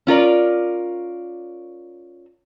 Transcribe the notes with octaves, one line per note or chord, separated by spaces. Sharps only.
C#4 F4 A#4 D5